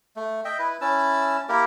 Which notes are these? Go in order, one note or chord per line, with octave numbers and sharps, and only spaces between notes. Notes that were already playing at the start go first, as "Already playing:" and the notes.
A3
D#5 E5 G5
E4 B4
C#4 E4 A5 E6
A#3 E4 G4 A#4